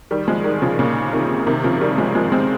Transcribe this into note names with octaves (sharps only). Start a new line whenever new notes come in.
D#3 G3
F3 G#3
D#3 G3
C#3 F3
A#2 C#3
C3 D#3
C3 D#3
C#3 F3
D#3 G3
F3 G#3
F3 G#3
G#3 C4